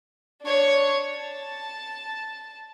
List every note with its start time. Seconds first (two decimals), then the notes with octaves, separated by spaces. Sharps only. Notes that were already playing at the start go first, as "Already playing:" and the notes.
0.42 D4 C#5
1.18 A5